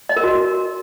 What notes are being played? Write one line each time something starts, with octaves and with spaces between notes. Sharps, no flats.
D#5
A#4
F#4